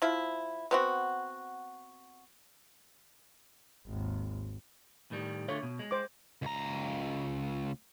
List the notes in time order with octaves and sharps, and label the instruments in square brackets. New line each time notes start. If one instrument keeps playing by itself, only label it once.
[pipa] F3 E4
B3 C4 F#4
[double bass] G#1 D#2
[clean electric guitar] A2 D#3 G3
[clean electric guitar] D3 A3 F4 [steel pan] C#5
[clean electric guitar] B2
G#3
[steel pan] C5 D6
[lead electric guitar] C#2 A#5